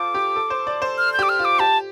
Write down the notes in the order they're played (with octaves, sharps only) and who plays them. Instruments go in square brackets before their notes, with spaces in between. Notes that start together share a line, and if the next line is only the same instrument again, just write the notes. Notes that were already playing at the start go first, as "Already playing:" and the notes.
Already playing: [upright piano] F4 A4 C5 [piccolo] D6
[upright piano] G4
A4
C5
D5
C5
[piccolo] F6
G6
[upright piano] G4 [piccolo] D6
[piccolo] F6
[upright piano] F4
[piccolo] D6
[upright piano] G4 [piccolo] A5